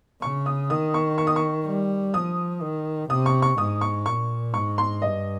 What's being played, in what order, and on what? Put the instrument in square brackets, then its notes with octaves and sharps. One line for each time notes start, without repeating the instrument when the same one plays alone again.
[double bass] C#3 [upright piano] C#6
[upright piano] D#6
[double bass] D#3 [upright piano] D#6
[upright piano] C#6
C#6
D#6
C#6
[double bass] G3
[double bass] F3 [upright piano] D#6
[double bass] D#3
[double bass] C3 [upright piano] D#6
[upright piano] C#6
C#6
[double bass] G#2 [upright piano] D#6
[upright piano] C#6
[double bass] A#2 [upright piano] C#6
[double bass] G#2 [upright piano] C#6
[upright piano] C6
[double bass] G2 [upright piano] D#5